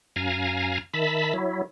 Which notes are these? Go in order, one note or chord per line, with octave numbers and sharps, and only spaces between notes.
F#2 F5 G#5 A#5
D#3 E5 A5 B5
F#3 E4